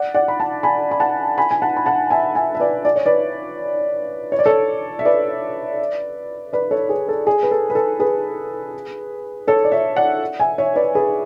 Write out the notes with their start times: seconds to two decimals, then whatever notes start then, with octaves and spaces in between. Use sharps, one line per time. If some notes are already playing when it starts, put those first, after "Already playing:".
Already playing: D5 F#5
0.14 D5 F#5
0.28 B5
0.40 F#5 A5
0.63 G#5 B5
0.91 B5
1.00 F#5 A5
1.38 G#5 B5
1.51 G#5
1.62 F#5 A5
1.77 B5
1.86 F#5 A5
2.10 E5 G#5
2.35 E5 G#5
2.55 E5
2.60 B4 D5
2.85 D5
2.96 C#5
3.06 B4 D5
4.32 C#5
4.39 D5
4.46 A4 C#5
4.99 E5
5.05 B4 D5
6.53 B4 D5
6.71 A4 C#5
6.89 G#4 B4
7.08 A4
7.27 G#4
7.43 B4
7.51 A4
7.70 B4
7.75 A4
8.00 G#4 B4
9.47 A4 C#5
9.64 D5
9.72 C#5 E5
9.96 D5 F#5
10.39 E5 G#5
10.58 C#5 E5
10.76 B4 D5
10.95 G#4 B4